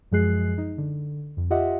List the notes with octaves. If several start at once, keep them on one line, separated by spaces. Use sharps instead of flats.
F#2 F3 G#3 G#4 F#6 C7
D#4
D3
F2
F4 G4 D#5 E5 F#5